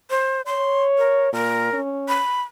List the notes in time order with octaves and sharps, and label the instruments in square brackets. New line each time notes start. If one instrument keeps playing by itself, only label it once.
[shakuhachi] C5
[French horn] C#5 [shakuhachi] C6
[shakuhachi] A#4
[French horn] A#2 [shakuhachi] A#4
[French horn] C#4
[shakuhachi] B5